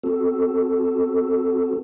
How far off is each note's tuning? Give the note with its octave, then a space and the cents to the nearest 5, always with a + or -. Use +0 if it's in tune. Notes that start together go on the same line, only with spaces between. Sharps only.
C4 +0 F#4 +0 A4 +0